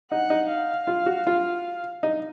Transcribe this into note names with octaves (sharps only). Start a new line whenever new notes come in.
D#4 F#5
D#4
F5
F4
F#4
F4
D#4